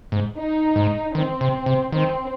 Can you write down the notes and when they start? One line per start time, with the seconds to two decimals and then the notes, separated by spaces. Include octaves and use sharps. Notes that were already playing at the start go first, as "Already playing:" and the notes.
0.12 G#2
0.37 D#4
0.76 G#2
1.15 D#3 C4
1.41 C3
1.66 C3
1.92 D#3 C4